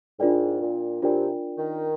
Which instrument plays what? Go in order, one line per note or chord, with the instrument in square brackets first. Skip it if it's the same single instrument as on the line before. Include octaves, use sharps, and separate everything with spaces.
[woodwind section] G#2 [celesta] D4 F4 A#4 D5 G5
[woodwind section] A#2
[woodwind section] C3 [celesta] D4 F4 A#4 D5 G5
[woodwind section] D#3